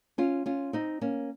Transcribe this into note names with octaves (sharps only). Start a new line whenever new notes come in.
C#4 F4
C#4 F4
C4 D#4
A#3 C#4